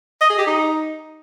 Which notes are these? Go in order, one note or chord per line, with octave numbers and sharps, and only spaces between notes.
D#5
G#4
G4
D#4